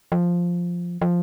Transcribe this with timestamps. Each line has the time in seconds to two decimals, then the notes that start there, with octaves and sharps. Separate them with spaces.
0.12 F3
1.02 F3